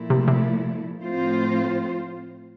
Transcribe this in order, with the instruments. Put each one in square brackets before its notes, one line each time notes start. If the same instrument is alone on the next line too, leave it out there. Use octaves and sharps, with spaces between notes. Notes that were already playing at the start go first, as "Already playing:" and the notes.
Already playing: [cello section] A#2 F3 A3 E4
[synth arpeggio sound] C3
C3
[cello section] A2 F3 C4 F4 C5